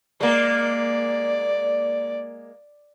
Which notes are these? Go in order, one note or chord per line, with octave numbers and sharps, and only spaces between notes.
G#3 A#3 D5